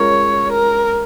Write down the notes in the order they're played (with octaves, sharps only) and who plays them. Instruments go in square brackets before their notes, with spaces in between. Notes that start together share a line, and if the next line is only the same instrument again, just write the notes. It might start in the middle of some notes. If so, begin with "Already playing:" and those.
Already playing: [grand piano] G#3 C#4 F4 A#4 [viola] C#5
[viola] A#4